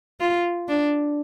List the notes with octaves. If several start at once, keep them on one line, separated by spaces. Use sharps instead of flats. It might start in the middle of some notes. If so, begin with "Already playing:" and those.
F4
D4